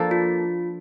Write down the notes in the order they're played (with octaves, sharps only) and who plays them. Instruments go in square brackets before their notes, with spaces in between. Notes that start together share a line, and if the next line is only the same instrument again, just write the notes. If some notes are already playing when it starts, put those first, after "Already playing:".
Already playing: [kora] F3 A#3 D4 A4
[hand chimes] F4